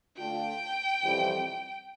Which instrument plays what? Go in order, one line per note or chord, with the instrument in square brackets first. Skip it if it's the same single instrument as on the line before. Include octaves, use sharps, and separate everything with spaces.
[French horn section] D3 A3 D4 F4 [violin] G5
[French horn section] F2 C3 E3 G3 C4